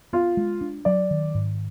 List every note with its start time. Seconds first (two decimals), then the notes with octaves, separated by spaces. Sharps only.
0.13 B3 F4
0.37 G#3
0.61 D4
0.85 F#3 D5
1.11 D#3
1.35 G#2